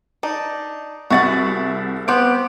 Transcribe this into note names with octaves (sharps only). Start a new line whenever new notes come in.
D4 D#4
C2 F#4 G#4 E5 F#5 A6
B3 C4 G4 C5 D7